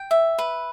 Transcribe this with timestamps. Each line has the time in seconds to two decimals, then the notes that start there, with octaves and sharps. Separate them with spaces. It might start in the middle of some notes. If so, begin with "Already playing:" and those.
Already playing: G5
0.11 E5
0.38 B4